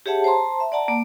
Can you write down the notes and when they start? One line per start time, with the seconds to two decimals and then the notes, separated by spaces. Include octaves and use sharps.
0.06 G4 G#4 C#5 E5 F#5 A5
0.24 C5 A5 A#5 C6
0.60 E5
0.72 D5 F#5 A5 A#5
0.88 A#3